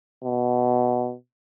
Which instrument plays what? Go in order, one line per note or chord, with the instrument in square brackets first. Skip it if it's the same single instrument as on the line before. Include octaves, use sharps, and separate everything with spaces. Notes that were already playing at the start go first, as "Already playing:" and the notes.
[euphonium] B2